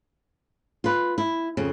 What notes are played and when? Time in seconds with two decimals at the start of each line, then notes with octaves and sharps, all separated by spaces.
0.84 F4 B4
1.18 E4
1.57 F2 C#3